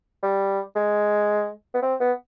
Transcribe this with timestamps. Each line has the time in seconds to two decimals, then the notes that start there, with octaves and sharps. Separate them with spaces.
0.23 G3
0.76 G#3
1.74 B3
1.82 C4
2.00 B3